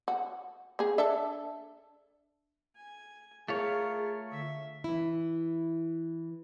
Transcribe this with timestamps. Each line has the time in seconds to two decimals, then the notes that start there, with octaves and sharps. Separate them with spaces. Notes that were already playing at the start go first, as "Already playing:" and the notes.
0.08 F#4
0.79 A#3 G#4
0.98 D4 A4 E5
2.76 G#5
3.48 A3 F4 G#4 A#4 C#5 F5
4.31 D3 E5
4.84 E3 E4